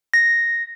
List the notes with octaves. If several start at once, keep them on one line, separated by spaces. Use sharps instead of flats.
A#6